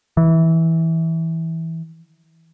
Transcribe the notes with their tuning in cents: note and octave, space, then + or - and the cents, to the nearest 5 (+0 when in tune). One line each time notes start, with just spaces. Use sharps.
E3 -15